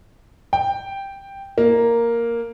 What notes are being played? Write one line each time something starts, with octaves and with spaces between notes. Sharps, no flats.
G5
A#3